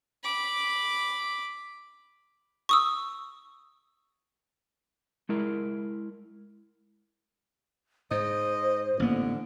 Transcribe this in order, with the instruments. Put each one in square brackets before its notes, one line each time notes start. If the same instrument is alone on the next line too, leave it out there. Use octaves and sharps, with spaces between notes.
[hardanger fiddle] B5 D6
[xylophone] C#6 D#6 E6
[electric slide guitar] G#3 E4 A#4
[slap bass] G#2 [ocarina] C5 [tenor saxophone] D#5
[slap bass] A1 B3 [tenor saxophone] D3 [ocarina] A#3